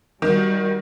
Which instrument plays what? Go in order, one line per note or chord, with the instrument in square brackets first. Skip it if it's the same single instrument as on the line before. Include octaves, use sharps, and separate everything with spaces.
[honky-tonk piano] D#3 [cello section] G3 F#4